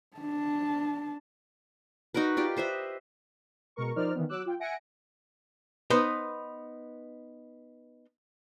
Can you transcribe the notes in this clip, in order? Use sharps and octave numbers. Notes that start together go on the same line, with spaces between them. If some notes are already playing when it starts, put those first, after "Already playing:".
D4 A5
D#4 F#4 A#4 B4
F4 G4 D5
B4 C5 D#5 E5
B2 G#3 A#4 C#6
F3 D#4 A#4 C5 D5 F6
D#3 E3 B3
F#3 D6 E6 F#6
F4 G5
E5 F#5 G#5 A#6 C#7 D7
B3 D#4 B4 C5